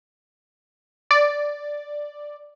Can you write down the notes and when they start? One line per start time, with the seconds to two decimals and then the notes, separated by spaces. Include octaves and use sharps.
1.11 D5